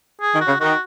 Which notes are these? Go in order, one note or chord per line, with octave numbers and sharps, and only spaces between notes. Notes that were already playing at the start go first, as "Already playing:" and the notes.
G#4
D#3
F#4
C#3
D#3 F#4